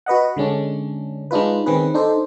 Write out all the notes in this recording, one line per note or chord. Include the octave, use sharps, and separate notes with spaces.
F#4 B4 D#5 F#5
D3 G#3 C#4 D4
G#3 D4 D#4 F4 B4
D#3 C4 C#4 G#4 B4
D4 D#4 A4 C5 D5